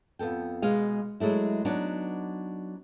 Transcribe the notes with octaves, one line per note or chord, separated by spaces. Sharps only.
F2 B3 A4 G5
B2 G#3 F5
F#3 G#3 A3 E4
F#3 B3 D4 D#4